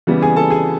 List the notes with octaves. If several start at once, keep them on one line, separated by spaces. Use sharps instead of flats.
E2 C#3 E3 G3 B3
G#4 G#5
A4 A5
G#4 G#5